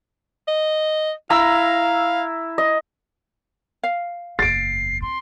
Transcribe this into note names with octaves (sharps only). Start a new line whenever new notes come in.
D#5
E4 F5 A#5 E6
D#5
F5
F#1 E2 A6 C7 D7
C4 C6